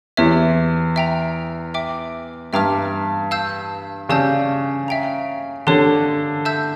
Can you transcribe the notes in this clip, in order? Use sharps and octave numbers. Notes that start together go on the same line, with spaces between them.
E2 G4 C#5 E5
E5 G5 A#5
E5 G5 D6
G2 E5 G5 A#5 D6 F6
F5 A5 E6 G6
C#3 G4 D5 A5 E6 G6
E5 G5 A#5
D3 G4 A#4 C#5
E5 A5 E6 G6